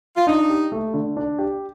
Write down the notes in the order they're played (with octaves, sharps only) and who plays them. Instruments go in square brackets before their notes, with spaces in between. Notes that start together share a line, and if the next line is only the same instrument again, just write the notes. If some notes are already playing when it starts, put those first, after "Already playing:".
[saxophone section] F4
[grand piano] D4 [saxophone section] D#4
[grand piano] G4
A3
D3
D4
G4